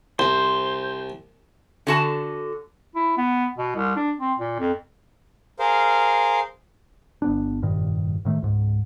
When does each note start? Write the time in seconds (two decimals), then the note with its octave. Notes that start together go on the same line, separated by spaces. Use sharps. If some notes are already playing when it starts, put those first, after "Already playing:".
0.19 C2 C5
1.87 D3 F#4 A5
2.95 E4
3.18 B3
3.58 B2
3.76 C2
3.96 D4
4.20 C4
4.39 A#2
4.59 F2
5.59 G#4 A#4 C5 F5
7.22 G1 B3 D4
7.62 F1 G2 A#2 D#3
8.25 A2 D#3 A3
8.42 C#2 G#2